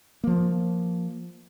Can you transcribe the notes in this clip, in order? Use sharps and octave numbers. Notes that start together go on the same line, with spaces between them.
F3 A#3